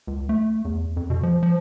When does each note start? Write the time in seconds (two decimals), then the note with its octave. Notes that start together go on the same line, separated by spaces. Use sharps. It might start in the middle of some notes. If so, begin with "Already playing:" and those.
0.07 C#2
0.29 A3
0.65 E2
0.97 F2
1.10 B2
1.23 F3
1.43 F3